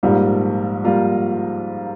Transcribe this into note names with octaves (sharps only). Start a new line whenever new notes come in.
A#1 G#2 G3 A#3
G3 A#3 F4